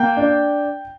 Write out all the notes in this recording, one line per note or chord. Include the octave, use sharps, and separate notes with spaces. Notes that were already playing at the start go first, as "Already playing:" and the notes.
Already playing: A#3 G5 G6
D4